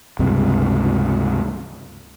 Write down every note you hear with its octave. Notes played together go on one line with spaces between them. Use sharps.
C#2 G2 C3